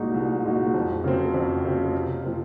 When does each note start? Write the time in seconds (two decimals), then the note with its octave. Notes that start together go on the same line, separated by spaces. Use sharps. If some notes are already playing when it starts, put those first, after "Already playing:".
Already playing: C2 A#2 G#3 D#4 F#4
0.14 C2
0.45 A#2 G#3 D#4 F#4
0.74 F2
1.04 C#3 F#3 C4
1.34 F2
1.65 C#3 F#3 C4
1.94 C3
2.24 F3 C4